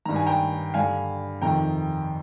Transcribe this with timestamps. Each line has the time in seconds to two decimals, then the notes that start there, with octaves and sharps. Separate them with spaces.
0.05 G2 D#3 A#5
0.16 G#5
0.26 G5 A#5
0.74 G2 D3 F5 G#5
1.42 F2 C3 D#3 G5 A#5